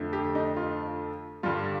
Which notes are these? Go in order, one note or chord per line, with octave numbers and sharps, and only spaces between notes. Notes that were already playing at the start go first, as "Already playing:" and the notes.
Already playing: F2 D3 A3
G4
D#4
F4
G2 D3 G3 F4